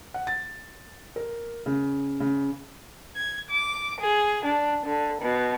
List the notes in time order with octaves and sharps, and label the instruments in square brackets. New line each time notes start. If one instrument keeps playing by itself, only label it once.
[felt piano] F#5
A6
A#4
C#3
C#3
[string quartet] G#6
D6
G#4
D4
D3
B2